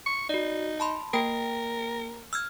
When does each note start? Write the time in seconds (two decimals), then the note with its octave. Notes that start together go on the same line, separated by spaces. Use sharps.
0.06 C#6
0.29 D#4 F#4 D5
0.80 A5 B5 C6
1.14 A#3 A#4 G5
2.33 E6 F6 G#6